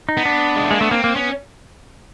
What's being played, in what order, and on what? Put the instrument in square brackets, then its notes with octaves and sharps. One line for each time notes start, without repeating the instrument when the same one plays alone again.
[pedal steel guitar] D#4
[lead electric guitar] B3
[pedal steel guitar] D4
[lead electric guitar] G#3
A3
[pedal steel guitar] G#3 [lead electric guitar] A#3
[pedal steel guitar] A3 [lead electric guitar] B3
[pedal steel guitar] A#3 [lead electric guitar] C4
[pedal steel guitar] A#3
[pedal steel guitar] B3 [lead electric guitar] C#4